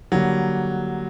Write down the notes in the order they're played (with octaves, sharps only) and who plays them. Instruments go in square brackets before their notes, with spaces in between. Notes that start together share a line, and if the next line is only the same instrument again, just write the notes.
[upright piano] D3 G3 A#3 [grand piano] F#3